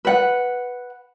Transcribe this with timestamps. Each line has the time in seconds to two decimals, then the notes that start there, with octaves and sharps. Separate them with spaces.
0.05 B4 F#5